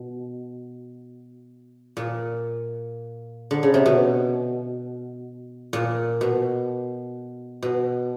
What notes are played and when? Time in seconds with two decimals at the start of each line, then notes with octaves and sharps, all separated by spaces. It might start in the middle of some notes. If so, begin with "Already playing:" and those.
Already playing: B2
1.97 A#2
3.51 D3
3.63 C#3
3.74 C3
3.86 B2
5.73 A#2
6.21 B2
7.63 B2